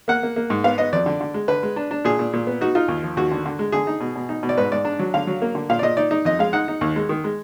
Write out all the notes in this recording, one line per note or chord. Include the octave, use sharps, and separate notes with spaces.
A#3 F#5
A#3
A#3
G#2
B3 F5
B3 D#5
F2 D5
D3
D3
G#3
D3 B4
G#3
D4
D4
A#2 G#4
A#2
A#2
B3
D#4 F#4
D#4 F4
D#2
F3
D#2 F#4
D3
D3
G#3
D3 G#4
D#4
B2
B2
D#4
B2
D5
G#2 B4
G#2 D5
D4
F#3
D3 F5
F#3
A#3
D3
A#2 F5
D5
A#2 D#5
D#4 D5
D#4
F2 D#5
G#3 F5
D#4 F#5
D#4
D#2
G#3
D#3
G#3